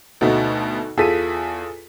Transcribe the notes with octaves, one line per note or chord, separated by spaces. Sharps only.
D2 B2 A3 D#4 F#4 A4
E2 F4 G#4 A4 B6 D#7